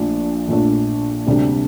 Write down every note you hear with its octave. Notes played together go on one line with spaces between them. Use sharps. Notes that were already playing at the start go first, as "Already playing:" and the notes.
Already playing: A#1 A#2 F3 A3 D4
A#1 A#2 F3 A3 D4
D2 C3 G3 D4 G4